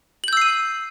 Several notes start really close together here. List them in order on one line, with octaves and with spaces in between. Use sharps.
F#7 G6 E6 C7 D#7